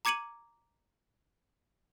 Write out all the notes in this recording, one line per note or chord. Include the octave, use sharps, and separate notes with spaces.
A#5 D6 G#6 C#7 D#7 F#7